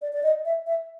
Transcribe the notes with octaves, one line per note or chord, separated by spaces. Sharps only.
D5
D5
D#5
E5
E5